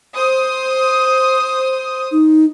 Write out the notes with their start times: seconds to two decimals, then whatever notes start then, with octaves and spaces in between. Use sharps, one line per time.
0.15 C5 D#6
2.11 D#4